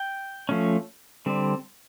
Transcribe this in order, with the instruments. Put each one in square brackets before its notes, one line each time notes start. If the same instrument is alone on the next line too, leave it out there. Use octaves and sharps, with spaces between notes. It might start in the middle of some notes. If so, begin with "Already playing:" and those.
Already playing: [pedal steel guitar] G5
F3 A3 C#4
D3 G3 C4